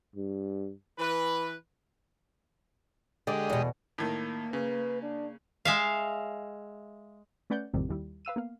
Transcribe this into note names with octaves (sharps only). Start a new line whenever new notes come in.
G2
E3 B4
D3 G#3 G4 D5 D#5
E2 B2
A2 D#3 A#3
C#3 B4
D4
G#3 E5 F5
A3 C#4 B4 D5 F#5 G6
A1 F2 A2 C3 D#3 G3
D#2 G3 E4
B4 F5 E6 D#7
A#3 B3 F5